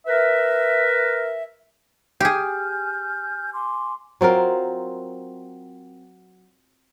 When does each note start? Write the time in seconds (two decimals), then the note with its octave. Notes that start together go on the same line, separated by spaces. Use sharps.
0.07 A#4 B4 E5
2.20 G4 G#4 G#5 F6 G6
3.53 G#5 C6 D6
4.21 F#3 C4 F4 A#4